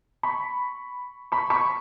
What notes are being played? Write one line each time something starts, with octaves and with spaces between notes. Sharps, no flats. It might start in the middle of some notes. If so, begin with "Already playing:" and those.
B5 C#6
B5 C#6
B5 C#6